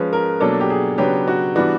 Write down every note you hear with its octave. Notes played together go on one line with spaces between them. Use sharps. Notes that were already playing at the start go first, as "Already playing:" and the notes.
Already playing: F3 G#3 C#4 B4
A#4
B2 F#3 A#3 D4 A4
G4
G#4
C#3 F#3 B3 D4 G4
F#4
E3 G3 B3 D4 F#4